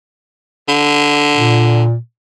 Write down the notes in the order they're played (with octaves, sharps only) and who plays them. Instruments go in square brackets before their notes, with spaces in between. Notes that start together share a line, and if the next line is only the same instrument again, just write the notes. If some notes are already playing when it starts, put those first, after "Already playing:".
[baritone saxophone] D3
[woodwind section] A#2